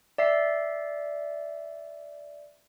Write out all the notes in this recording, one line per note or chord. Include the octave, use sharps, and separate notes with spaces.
D5 E5 C7